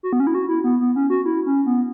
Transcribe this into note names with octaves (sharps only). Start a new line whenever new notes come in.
F#4
B3
C#4
E4
F#4
E4
B3
B3
C#4
F#4
E4
C#4
B3